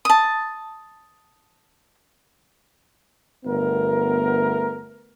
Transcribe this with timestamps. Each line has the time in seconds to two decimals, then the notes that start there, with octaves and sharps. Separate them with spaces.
0.05 A5 D#6
3.46 G1 A3 B3 A#4